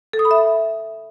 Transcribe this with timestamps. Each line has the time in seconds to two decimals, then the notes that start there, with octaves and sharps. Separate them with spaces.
0.13 A4
0.19 D#6
0.25 B5
0.31 E5